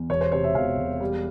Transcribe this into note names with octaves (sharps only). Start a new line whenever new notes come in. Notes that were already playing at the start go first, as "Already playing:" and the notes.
Already playing: E2
E1 C#5
C5
C3 C#5
E5
E1 F5
E1
G3